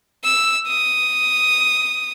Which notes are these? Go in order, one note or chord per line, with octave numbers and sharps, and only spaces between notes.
E6
D#6